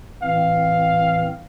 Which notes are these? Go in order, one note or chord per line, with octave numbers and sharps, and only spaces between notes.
A2 E3 C4 F5